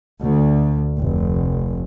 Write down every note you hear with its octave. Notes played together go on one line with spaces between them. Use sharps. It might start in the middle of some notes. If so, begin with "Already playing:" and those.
D2
F1